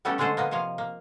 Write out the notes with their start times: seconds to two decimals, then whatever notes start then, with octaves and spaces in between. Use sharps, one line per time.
0.05 G3 A3 B3 C#4 G4 A4
0.18 D3 G#3 A3 G#4 A4 C5
0.37 A#3 B3 D#5
0.51 C3 F3 C#5 D#5 F5
0.78 A#3